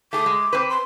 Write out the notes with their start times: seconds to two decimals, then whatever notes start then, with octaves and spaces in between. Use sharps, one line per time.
0.13 A3 G#4 D6
0.26 G#3
0.53 C4 B4
0.70 C6